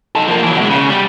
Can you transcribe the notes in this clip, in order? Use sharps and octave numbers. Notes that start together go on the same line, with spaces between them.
D#4 A4
F3 A#3
E3 F#3
B2 G#3
C#3
G3